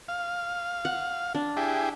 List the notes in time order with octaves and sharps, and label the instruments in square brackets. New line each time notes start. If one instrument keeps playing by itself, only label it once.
[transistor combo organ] F5
[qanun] F#5
D4
[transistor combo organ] E4 G4 G#4